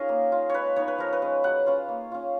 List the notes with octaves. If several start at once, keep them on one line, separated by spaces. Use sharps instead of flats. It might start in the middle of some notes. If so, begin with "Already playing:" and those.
Already playing: C#4 D#4 F4 G#4 A#4
A#3
F4
G#3 B4 C#5
B3 D#4 C#5
B4
F3 A#4
B4
G#3 C#4
F#3 F#5
C#4 F4
A#3
C#4 F4